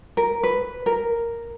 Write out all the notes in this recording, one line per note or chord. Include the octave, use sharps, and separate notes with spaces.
A#4
B4
A#4